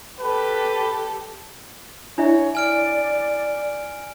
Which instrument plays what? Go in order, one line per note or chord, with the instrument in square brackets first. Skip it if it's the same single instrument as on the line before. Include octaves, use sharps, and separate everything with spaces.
[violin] G4 A4 [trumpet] B4
[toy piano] D4 E4 E5 [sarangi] C#5
[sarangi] D5 [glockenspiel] G#5 F6 D7